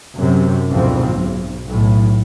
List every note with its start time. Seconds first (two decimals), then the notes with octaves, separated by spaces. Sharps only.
0.18 F#2 C3
0.72 D2 G#2 B2 F3 C4
1.08 B1
1.70 B1 A2